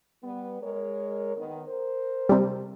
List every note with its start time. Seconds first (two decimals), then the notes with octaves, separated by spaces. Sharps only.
0.24 G3 B3
0.62 G#3 A#4 C#5
1.37 D#3 B3
1.67 A#4 C5
2.29 C3 G3